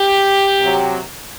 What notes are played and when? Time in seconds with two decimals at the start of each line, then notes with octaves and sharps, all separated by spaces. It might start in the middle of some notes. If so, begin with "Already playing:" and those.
Already playing: G4
0.61 C3 F#3